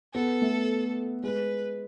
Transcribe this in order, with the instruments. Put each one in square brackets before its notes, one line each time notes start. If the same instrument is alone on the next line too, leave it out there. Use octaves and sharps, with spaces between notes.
[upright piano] B3 [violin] A4
[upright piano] A3
[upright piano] G#3 [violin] B4